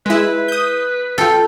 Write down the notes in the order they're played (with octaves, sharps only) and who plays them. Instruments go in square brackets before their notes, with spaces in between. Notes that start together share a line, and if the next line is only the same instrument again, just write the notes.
[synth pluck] G#3 E4 [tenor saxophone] B4
[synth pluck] D#6 G6
[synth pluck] F4 G5 [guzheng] A4